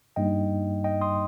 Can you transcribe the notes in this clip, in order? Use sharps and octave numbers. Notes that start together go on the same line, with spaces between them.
G2 G3 A#3 D#4 D#5 G5
D#5 G5
C6 D#6